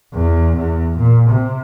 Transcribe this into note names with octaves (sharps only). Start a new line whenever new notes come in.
E2
E2
A#2
C3